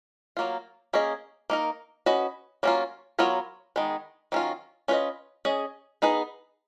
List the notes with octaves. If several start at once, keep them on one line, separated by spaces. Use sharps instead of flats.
F#3 A#3 F4
A#3 C#4 G#4 D#5
A#3 D#4 A#4
C#4 F#4 B4 D#5
F#3 A#3 C#4 F4
F#3 B3 F4 A#4 C#5
D#3 G#3 B3
D#3 F#3 C#4 F4
C#4 F4 B4 D#5
C#4 G#4 D#5
B3 D#4 G#4 B4